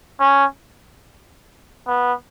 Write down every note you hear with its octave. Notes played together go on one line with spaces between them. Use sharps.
C#4
B3